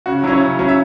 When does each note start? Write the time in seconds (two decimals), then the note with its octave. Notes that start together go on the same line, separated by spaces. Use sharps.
0.06 C#3 F#4
0.23 F#3 E4
0.28 C#4 C#5
0.40 C#3
0.59 F#3 C#4
0.68 E5